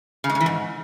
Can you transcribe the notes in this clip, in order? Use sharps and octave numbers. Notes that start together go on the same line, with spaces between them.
C#3
G#3
C#3
E3
G#2